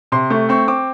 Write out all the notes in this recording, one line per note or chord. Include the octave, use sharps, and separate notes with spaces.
C3 C6
A3 C#6
C4 C#6
C4 D6